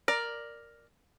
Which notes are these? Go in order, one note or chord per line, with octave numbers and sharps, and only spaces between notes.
A#4 D5